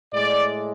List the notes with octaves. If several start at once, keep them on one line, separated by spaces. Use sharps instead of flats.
A2 G#3 D5